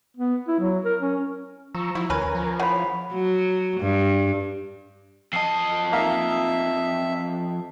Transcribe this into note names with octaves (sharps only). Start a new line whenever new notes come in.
B3
E4
F#3
A#4
C#4
F3 A#5 C#6 E6
F3 E4 F#4
D2 C#4 A#4 B4 G#5 A#5
F3
C#3 E3 C#5 F#5 B5
F#3
G2
F2 D#5 A5 C7
A#3 D#4 E5 F5